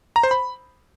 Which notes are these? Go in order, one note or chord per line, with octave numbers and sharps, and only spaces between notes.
A#5
C5
B5